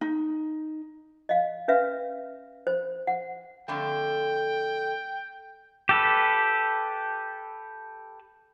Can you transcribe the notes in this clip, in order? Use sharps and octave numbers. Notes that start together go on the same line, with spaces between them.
D#4
D#5 F5
C#4 B4 E5 F5
C5
F#5
F2 D3 A3 G5
G4 A4 B4